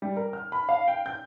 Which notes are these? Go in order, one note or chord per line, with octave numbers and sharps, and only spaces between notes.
G3
A#4
F6
B5
F5
G5
G6